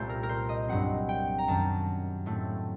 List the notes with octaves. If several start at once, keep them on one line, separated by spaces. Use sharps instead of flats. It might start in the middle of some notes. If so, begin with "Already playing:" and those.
Already playing: C2 A#2 A3 C4 C5
A#4
A#4
C5
D#5
G2 F#3 C4 F#5
G5
A#5
F#2 D#3 F#3 A5
A2 A3 C4